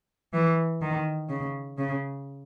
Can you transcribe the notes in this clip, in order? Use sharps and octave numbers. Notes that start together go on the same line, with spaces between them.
E3
D#3
C#3
C#3